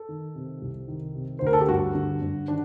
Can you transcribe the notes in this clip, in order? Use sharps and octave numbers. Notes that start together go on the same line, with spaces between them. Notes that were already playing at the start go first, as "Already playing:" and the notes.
Already playing: A4
D#3
C3
C2
D#3
C3
C5
D2 A#4
A4
G4
G2 F#4
D3
G2
D#3 D4